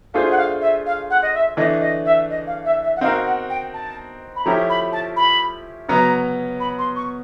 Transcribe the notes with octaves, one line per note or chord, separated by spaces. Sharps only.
A3 D4 F4 G#4 C5 F5
F#5
F5
E5
F5
F#5
D#5
E5
E3 A3 D4 D#5
D#5
E5
D#5
F5
E5
E5
F#5
C4 D#4 F#4 A#4 F5
F#5
G5
A5
B5
F3 A3 C#4 E4 G4 A#5
B5
A5
B5
C#3 F#3 B3 A#5
B5
C6
C#6